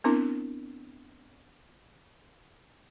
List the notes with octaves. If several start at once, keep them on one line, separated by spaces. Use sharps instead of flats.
B3 C4 D4 E4 A#4